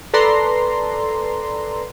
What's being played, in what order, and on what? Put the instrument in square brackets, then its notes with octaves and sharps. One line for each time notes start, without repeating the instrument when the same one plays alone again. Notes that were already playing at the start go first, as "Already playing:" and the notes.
[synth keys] A4 B4 D5 A#5 C6